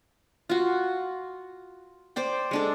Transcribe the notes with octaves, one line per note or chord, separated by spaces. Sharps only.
F4 F#4
C5 D5 G5
G#3 D4 A4